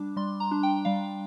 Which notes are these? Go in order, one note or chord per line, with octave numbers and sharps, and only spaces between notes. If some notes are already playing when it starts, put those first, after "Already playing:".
Already playing: G3 D4 D6
G3 C6
A#5
D4
G5
G3 F5